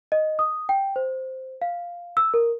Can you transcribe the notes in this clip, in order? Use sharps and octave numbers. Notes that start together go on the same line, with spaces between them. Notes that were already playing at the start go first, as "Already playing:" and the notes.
D#5
D#6
G5
C5
F5
E6
A#4